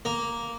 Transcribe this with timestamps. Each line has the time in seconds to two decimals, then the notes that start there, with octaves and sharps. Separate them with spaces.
0.05 A#3